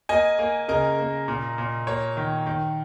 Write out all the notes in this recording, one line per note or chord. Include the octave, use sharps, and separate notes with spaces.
A#3 D#5 G#5
A#3
C#3 A#4 D#5
A#3
A#2
A#2
A#3 C#5
D#3
D#3